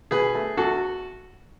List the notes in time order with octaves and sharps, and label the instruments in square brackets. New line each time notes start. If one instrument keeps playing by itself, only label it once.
[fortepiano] B2 G#4 B4
A3
E2 F#4 A4